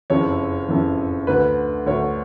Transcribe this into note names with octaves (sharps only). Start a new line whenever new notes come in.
F#1 F2 C#3 E3 C#5
F#1 F2 C#3 E3
D2 D3 B4
D2 D3 C#5